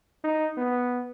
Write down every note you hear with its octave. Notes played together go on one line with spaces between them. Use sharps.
D#4
B3